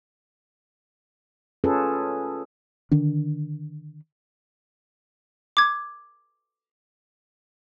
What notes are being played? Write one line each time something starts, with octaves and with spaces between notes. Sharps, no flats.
C#4 F4 G#4 A4 B4
D3 D#3 D4
D6 G#6